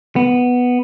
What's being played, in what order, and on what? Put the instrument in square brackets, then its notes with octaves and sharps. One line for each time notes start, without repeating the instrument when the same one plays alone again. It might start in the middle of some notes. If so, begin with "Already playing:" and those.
[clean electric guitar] B3